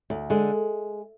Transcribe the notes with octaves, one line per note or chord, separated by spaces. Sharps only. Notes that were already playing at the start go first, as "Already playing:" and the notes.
D2
D3 G#3